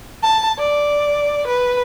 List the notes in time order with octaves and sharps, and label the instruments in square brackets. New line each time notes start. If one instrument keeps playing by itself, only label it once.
[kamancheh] A5
D5
B4